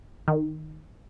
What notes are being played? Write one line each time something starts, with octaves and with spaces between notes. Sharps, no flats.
D#3